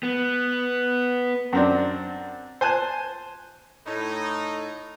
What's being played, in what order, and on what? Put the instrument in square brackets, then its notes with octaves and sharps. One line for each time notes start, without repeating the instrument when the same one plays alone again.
[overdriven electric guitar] B3
[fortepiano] F#2 C4 D4
C5 G#5 A5 F#6
[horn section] A2 D#4